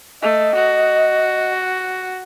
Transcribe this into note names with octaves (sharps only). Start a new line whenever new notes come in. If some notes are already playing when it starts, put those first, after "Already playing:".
A3 D#5
F#4